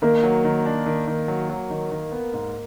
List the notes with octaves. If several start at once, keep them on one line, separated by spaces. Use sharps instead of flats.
D#3 A#3
F#3
D#3
D4
D#3
D#3
F#3
F#3
D#3
D#3
B3
G#2